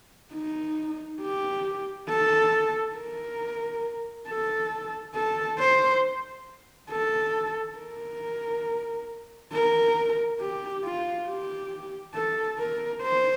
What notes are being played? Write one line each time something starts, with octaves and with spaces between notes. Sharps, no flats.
D#4
G4
A4
A#4
A4
A4
C5
A4
A#4
A#4
G4
F4
G4
A4
A#4
C5